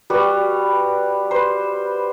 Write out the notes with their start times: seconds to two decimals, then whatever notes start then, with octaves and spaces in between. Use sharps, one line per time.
0.10 G3 F#4 B4
1.31 B4 C5